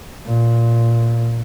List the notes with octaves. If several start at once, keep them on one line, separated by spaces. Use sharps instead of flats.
A#2